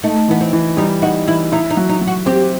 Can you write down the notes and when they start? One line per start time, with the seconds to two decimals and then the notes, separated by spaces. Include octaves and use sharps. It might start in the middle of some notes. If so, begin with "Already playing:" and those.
0.03 A3 D#4
0.28 E3 B3
0.41 C4
0.53 E3
0.77 G3 D#4
1.02 D#4 F#4
1.27 E3 E4
1.52 D#4 E4
1.70 D#4
1.77 F#3
1.89 D#4
2.01 F#3
2.07 F#4
2.26 C4 G4